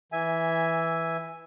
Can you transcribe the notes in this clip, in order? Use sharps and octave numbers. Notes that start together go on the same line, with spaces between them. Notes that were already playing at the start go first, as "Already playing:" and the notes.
E3 E5 G#5